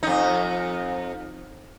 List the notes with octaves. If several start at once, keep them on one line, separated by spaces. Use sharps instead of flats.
F2 D#4